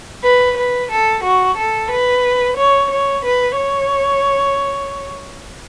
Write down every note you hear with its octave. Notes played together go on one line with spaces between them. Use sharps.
B4
B4
A4
F#4
A4
B4
C#5
C#5
B4
C#5